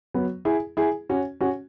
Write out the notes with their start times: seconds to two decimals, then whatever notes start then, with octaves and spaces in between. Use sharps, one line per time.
0.14 F#3 B3
0.45 E4 G#4
0.77 E4 G#4
1.09 C#4 F#4
1.41 C#4 F#4